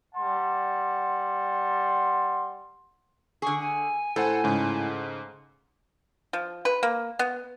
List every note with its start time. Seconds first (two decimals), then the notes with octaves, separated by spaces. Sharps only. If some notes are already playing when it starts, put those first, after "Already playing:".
0.15 G3 F#5 A5 C6
3.42 D3 G#4 C#6
3.60 G#5
4.16 A2 A4 C5 F#5
4.44 G#2 C#3
6.33 F3
6.65 B4
6.83 A#3
7.19 B3